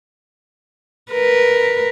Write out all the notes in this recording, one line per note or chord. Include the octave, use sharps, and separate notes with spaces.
A#4 B4